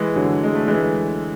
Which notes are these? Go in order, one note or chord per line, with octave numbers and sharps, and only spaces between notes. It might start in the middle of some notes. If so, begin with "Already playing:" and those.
Already playing: E3 G#3
D3 F#3
G#3
A3
E3 G#3